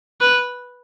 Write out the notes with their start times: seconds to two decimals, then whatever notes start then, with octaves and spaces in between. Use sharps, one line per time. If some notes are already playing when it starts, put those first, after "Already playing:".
0.21 B4